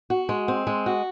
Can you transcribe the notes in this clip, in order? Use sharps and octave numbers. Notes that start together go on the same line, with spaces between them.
F#4
G#3
C4
G#3
F#4